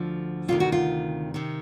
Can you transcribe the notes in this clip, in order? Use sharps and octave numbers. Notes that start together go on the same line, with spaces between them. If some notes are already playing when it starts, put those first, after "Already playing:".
Already playing: D2 D3 F3
D2 C3 D#3 F4
F#4
F4
C3 D#3